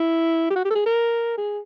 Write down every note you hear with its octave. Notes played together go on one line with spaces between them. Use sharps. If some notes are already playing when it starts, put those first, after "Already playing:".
Already playing: E4
G4
F#4
G4
A4
G#4
A#4
G#4